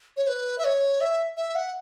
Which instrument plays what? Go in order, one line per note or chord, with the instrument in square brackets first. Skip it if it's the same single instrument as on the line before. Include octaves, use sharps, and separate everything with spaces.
[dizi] C#5
B4
E5
C#5
E5
E5
F#5